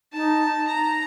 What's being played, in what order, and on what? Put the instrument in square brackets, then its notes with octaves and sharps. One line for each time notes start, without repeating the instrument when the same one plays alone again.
[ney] D#4 [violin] A5
[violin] A#5